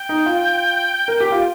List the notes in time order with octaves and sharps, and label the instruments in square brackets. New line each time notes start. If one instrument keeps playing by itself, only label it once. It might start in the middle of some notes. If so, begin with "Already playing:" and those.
Already playing: [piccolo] G5
[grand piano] D#4
F4
A#4
G4
F4